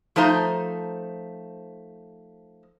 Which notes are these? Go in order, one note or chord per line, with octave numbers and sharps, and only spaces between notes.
F3 A3 D#4 C5 A#5